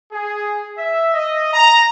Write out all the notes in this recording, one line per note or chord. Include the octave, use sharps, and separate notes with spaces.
G#4
E5
D#5
A#5